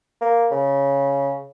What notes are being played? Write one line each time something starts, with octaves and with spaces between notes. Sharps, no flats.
A#3
C#3